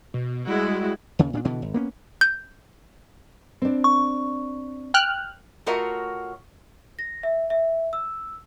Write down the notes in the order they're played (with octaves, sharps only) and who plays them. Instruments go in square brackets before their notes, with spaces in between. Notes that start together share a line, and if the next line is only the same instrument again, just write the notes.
[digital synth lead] B2
[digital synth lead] G3 [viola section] G#3 E4 F#4
[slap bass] D#2 C#3
A#2 C4 D4
B2 D3 E3
G#1
A#3 B3 C#4
[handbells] G6
[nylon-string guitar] C4 D4
[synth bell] C#6
[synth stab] G5 F6 F#6
[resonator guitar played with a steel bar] A3 F4 F#4 A#4 C#5 D#5
[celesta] A#6
E5
E5
E6